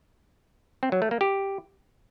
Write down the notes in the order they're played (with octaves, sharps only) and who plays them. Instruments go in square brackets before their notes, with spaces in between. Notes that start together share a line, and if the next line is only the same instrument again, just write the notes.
[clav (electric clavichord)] C4
F#3
A3
A#3
G4